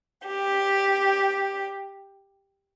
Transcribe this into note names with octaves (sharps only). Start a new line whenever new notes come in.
G4